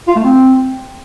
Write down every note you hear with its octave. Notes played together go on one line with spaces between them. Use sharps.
F4
A3
C4